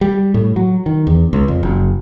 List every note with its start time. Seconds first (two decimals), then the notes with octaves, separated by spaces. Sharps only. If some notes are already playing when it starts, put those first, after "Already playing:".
0.01 G3
0.34 A2
0.56 F#3
0.86 D#3
1.07 E2
1.33 C#2
1.48 F2
1.63 F#1